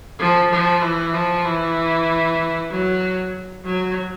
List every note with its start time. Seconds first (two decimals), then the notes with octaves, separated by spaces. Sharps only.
0.19 F3
0.51 F3
0.82 E3
1.14 F3
1.45 E3
2.71 F#3
3.65 F#3